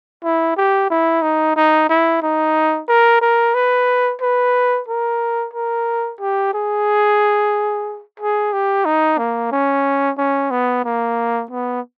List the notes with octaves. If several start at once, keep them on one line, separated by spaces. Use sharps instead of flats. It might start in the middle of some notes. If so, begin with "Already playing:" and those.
E4
G4
E4
D#4
D#4
E4
D#4
A#4
A#4
B4
B4
A#4
A#4
G4
G#4
G#4
G4
D#4
A#3
C#4
C#4
B3
A#3
B3